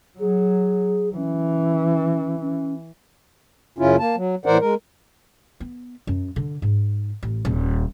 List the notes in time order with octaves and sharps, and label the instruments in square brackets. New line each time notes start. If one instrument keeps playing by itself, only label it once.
[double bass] F#3 [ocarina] G#4
[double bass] E3 [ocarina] C#4
[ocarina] C#4
[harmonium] F#2 C#3 C#4 E4 F4
A#3 A5
F#3
A2 E3 A#4 C5 D5 F#5
G#3 A#4
[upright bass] B3
F#2
D3
G#2
A1
D#1